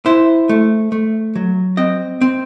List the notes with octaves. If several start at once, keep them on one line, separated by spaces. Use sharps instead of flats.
E4 C5
A3
A3
F#3
C4 D#5
C4